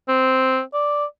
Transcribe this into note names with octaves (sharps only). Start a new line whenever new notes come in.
C4
D5